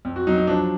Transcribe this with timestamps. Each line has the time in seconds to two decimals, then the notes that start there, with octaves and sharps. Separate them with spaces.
0.05 F2
0.16 F#4
0.27 F#3 D#4
0.38 D#4
0.47 F3 D4